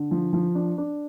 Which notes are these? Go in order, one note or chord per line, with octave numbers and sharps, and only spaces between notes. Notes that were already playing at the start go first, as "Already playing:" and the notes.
Already playing: D3
F3
F3
D4
D4